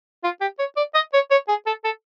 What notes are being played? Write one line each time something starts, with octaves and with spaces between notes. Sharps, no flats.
F4
G4
C#5
D5
D#5
C#5
C#5
G#4
A4
A4